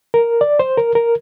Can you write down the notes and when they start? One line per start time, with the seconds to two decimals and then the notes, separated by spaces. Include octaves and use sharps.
0.14 A#4
0.41 D5
0.59 C5
0.78 A#4
0.95 A#4